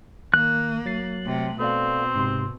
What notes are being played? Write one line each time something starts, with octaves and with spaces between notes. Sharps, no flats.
D#3 A#3 F#6
F#3 A6 C7
C3 A3
B2 C4 A4 D5 F5
G#2 C3 C6